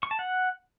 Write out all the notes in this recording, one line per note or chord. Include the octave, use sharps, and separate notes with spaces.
C#6
A5
F#5